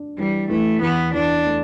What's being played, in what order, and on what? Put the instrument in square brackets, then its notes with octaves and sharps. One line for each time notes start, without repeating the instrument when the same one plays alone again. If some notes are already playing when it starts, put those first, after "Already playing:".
Already playing: [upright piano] D4
[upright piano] E3 [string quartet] G3
[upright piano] E3 [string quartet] A3
[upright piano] E2 [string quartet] B3
[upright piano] E2 [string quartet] D4
[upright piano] A3